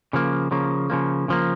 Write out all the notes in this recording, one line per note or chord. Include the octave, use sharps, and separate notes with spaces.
C#3 F3 A#3
C#3 F3 A#3
C#3 F3 A#3
C#3 F3 A#3